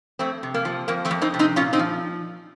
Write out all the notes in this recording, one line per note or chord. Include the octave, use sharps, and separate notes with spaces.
F2 A3 C4
C3
A#3
F3
F2 A#3
A3 C4
F2
C4 D#4
C3
C4 D#4
A#2 C#4 F4
C4 D#4
F3